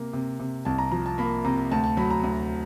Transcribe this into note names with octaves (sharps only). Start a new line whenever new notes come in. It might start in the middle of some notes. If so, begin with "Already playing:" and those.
Already playing: C3 A#3
C3
C3
C2 A5
A#5
F3 A#5
A5
A#3 B5
C3 A#5
D2 A5
A5
F#3 B5
A#5
D2